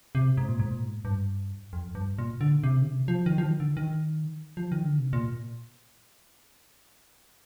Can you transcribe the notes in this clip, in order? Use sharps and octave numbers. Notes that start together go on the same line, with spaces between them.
C3
G#2
A#2
G#2
A#2
G#2
G2
F2
G2
A#2
D3
C3
D3
C3
F3
D#3
F3
D#3
D3
D#3
F3
D#3
D3
C3
A#2